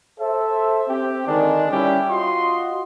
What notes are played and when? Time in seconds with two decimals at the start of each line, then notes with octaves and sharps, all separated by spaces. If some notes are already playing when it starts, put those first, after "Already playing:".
0.20 A4 C5 E5
0.89 C4 G4
1.27 D3 D#3 G#3 D4
1.71 G3 C#4 E4 G4
2.09 F4 F#4 D#5 C6